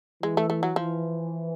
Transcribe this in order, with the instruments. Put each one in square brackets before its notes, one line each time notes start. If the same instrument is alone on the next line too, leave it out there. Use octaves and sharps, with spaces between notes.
[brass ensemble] E3 [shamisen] G#3
[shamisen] A3
A3
F#3
[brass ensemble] E3 [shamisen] F3